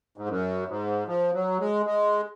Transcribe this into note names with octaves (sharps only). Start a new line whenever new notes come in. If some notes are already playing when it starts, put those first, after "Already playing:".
G#2
F#2
G#2
F3
F#3
G#3
G#3